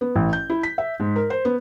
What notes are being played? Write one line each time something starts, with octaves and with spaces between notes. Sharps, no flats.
B3
A1
G6
E4
B6
E5
G#2
A#4
C5
B3